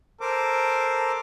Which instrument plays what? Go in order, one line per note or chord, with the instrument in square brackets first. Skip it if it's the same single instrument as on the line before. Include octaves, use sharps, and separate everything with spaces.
[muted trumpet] A4 [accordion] A#4 C5 D6